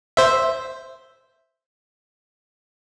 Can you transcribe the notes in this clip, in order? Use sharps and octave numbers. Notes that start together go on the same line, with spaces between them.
C5 E5